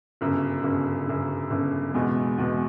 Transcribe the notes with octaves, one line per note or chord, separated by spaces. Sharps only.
G1 F#2 C#3
G1 F#2 C#3
G1 F#2 C#3
G1 F#2 C#3
E2 B2 G#3
E2 B2 G#3